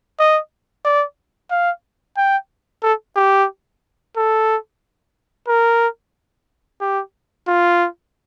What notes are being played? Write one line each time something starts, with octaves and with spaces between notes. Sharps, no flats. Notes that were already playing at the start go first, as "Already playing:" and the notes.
D#5
D5
F5
G5
A4
G4
A4
A#4
G4
F4